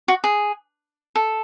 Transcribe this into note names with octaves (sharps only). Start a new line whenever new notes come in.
F#4
G#4
A4